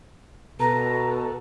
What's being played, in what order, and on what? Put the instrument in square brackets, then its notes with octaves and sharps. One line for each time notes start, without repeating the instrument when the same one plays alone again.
[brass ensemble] B2 [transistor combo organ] A4 [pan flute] B4 [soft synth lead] A#5